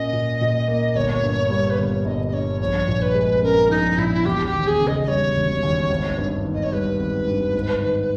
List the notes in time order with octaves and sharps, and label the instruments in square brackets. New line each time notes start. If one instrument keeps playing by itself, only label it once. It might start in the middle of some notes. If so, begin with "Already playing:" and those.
Already playing: [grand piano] A#2 A#3 C#4 [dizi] D#5
[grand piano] A#2
A#2
A#3
[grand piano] G1 [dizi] C#5
[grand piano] G2
G3
[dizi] B4
[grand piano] G1 [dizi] C#5
[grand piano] G1 [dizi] D#5
[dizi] D#5
[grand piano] G2 [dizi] C#5
[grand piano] A#1 [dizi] C#5
[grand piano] A#2
[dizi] B4
[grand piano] G#3
[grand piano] C#4 [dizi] A#4
[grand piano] A#1 [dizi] D#4
[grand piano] A#2 [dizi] E4
[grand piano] E1 [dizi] G4
[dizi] G4
[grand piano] D#2
[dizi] G#4
[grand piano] C#3
[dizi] D#5
D#5
[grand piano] G3 [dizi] C#5
[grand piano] E1
D#2
G#1
G2
D#3
[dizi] D#5
C#5
[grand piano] G3 [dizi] B4
[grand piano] G#1
G2
G#2
D#3